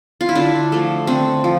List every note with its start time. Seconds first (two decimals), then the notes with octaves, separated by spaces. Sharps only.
0.21 F4
0.29 E4
0.35 D3 D4
0.72 F3 A3
1.07 D3 C4
1.44 F3